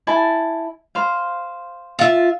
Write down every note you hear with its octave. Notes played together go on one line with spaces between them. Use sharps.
E4 G#5 A5
C5 F5
F4 E5